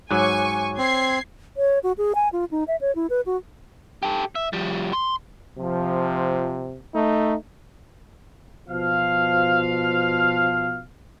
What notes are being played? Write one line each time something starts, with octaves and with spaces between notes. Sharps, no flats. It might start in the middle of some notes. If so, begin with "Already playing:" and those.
G#2 F#3 C#5 G#5 C#6 D6 F#6
C4 G#6 C7
C#5
F#4
G#4
G#5
F4
D#4
E5
C#5
E4
B4
F#4
G4 A4
E5
F3 G3
C6
C3 F3
A3 D#4
B2 F3 F5